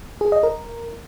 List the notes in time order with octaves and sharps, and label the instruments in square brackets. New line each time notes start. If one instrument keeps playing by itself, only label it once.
[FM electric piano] G#4
D#5
A#4